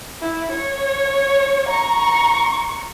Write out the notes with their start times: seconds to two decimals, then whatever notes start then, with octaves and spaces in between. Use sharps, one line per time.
0.21 E4
0.52 C#5
1.69 A#5 C#6